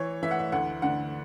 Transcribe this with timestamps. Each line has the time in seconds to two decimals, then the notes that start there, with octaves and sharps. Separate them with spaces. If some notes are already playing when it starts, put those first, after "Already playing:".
Already playing: E3 C#5
0.23 E3 E5
0.31 F#5
0.39 E5
0.52 D2 F#5
0.82 D3 F#5